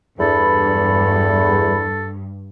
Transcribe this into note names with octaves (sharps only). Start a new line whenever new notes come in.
E2 G2 A4 B5